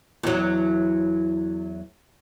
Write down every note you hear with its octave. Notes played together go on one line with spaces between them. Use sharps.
E2 F#3